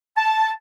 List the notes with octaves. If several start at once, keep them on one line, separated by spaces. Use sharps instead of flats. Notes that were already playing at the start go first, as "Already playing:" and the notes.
A5